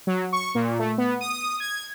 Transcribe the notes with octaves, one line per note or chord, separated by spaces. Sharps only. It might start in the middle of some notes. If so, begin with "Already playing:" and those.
F#3
C#6
A#2
A3
B3
D#6
G#6